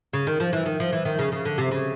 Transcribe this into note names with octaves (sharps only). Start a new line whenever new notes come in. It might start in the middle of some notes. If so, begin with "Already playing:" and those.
C#3
D#3
F3
E3
D#3
F3
E3
D#3
C#3
C#3
D3
C3
C#3